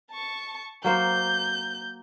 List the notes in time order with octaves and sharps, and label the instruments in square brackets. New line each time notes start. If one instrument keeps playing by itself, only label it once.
[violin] A5 C#6
[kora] F#3 A#3 C5 [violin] G6